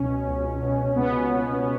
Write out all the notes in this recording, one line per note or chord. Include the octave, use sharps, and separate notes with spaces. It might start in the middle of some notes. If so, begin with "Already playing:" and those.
Already playing: C#2 B2 C#4
C#2
B2
C#2 B3
B2